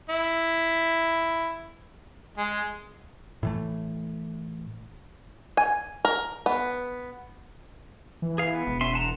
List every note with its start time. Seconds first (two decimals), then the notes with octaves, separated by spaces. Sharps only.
0.10 E4
2.38 G#3
3.43 A2 E3 A3
5.57 G#5
6.05 A#4
6.46 B3
8.22 E3
8.38 G#4 F5
8.53 B3
8.67 E1
8.81 C#4 E5 C6
8.94 F#5 A5 A#5